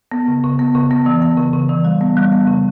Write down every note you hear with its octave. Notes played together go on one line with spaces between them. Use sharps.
B3
C#3
C#3
B3
C#3
B3
E3
B3
C#3
C#3
E3
G3
B3
G3
B3
C#3